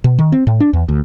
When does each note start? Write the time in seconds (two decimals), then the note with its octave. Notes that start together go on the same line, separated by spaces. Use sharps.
0.04 B2
0.18 D#3
0.32 C4
0.47 A2
0.60 D4
0.73 E2
0.89 D2